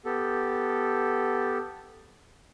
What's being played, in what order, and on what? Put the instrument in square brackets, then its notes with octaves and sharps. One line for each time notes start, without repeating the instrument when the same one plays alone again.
[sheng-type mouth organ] B3 G4 A4